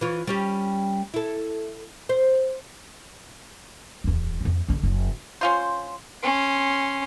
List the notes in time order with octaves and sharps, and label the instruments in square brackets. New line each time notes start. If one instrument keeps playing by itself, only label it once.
[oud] E3 F4 C#5
G3 C#4 G4
E4 A4
C5
[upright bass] D1 E2
F2 A#3
A#1 D3
F#1
[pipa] C#4 F4 C5
[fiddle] C#4 C6